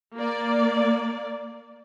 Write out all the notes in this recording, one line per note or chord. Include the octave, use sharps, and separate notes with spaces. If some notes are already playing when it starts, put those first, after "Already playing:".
A#3 D5